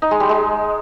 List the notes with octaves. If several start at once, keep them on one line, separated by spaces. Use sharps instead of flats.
D#4
G#3
G3
G#3